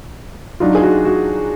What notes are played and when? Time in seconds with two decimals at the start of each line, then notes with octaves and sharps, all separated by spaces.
0.60 F#3 D4 D#4 F4
0.75 G#4
0.83 F#4
1.05 F#4